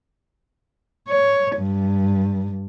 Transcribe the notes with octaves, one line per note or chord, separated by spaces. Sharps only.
C#5
G2